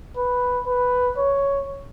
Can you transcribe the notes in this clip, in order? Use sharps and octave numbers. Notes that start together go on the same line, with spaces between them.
B4
B4
C#5